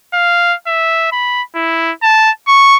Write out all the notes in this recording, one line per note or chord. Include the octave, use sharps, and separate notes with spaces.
F5
E5
B5
E4
A5
C#6